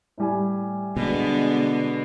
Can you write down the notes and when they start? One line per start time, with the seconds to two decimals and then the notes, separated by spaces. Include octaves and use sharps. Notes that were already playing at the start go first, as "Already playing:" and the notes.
0.18 A2 G3 G#5
0.97 B2 D3 G#3 B3